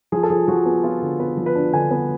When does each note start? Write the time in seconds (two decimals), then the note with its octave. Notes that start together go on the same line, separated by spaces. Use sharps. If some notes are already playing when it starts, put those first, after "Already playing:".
0.12 F3 G#4
0.23 A4
0.30 F3 G#4
0.48 F3 F#4
0.66 B3 G#4
0.83 B3 F4
1.02 D3
1.19 B3 B4
1.37 F3
1.46 B4
1.55 D4
1.73 D3 G#5
1.91 B3